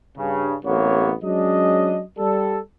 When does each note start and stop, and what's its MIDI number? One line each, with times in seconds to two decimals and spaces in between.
0.16 0.54 43
0.16 0.54 49
0.64 1.12 33
0.64 1.12 42
0.64 1.12 48
0.64 1.12 58
0.64 1.12 59
0.64 1.12 73
1.23 2.00 54
1.23 2.00 56
1.23 2.00 61
1.23 2.00 62
1.23 2.00 75
2.18 2.57 55
2.18 2.57 69